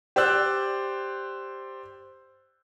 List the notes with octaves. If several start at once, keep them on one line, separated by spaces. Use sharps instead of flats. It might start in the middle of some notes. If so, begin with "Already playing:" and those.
G4 C5 D5 E6 F#6